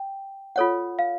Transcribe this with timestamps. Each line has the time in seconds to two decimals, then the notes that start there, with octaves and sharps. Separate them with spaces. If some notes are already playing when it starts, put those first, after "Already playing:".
Already playing: G5
0.56 F4 A4 C#5 F#5
0.99 F5